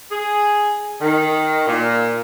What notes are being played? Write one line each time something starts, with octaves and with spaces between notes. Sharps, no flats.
G#4
D#3
A#2